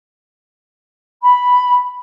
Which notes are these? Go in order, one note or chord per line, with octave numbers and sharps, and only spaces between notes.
B5